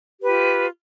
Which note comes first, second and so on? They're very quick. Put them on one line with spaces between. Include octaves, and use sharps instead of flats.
G4 B4 F4